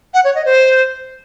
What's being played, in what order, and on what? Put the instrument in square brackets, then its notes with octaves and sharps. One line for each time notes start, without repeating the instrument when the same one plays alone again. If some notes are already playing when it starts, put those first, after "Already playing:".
[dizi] F#5
C#5
D#5
C5